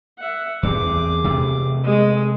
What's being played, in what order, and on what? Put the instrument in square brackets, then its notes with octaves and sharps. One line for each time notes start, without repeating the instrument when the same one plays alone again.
[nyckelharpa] E5 F#5
[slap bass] E2 C4 [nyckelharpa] G#4 D6
[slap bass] C3 A3
[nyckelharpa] G#3 D#6